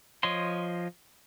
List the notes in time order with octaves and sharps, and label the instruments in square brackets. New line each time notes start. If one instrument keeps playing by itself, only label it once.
[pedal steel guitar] F3 C#5 D#5 C6